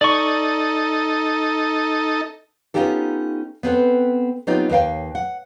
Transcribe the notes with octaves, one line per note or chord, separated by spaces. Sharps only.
D#4 A4 D5 C#6
B3 C#4 D#4 F4 G4 A4
B3 C4 A4 B4
F#3 B3 C4 D#4 F4 G4
D#2 B4 F5 G5
F#5